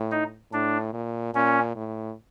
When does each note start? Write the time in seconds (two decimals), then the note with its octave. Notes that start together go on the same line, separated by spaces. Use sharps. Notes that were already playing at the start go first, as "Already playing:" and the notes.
Already playing: A2
0.11 D#4
0.52 A2 D4
0.93 A#2
1.34 A#2 C#4
1.75 A2